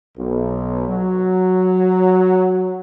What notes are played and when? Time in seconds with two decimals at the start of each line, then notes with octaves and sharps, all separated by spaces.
0.17 B1
0.87 F#3